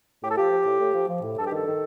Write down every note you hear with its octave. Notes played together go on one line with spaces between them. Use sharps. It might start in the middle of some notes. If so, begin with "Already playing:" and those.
A2 G4
A4
F3 G4
F3
A2
A2
F3
F3
A2
G2 A4
G4
D#3 A4
D#3